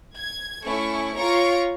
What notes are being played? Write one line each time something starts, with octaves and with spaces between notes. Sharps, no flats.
G#6
A3 C#4 E4 C#6
F4 C#5 A#5 C#6 D7